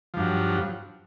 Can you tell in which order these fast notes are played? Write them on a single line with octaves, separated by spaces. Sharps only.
F3 G2 F#3